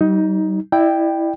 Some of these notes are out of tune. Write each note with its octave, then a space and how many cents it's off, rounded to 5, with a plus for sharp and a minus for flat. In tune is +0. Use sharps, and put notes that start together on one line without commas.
G3 -40 D#4 +15
E4 +0 D5 +35 G5 +0